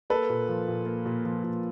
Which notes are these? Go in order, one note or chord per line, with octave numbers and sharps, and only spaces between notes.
A#3 A4 B4
A#2
F3
A#2
A#3
A#2
F3
A#2